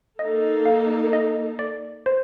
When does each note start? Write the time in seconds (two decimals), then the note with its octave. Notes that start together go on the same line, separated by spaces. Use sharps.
0.19 A#3 D#4 A4 D#5
0.66 F5
1.13 D#5
1.59 D5
2.06 C5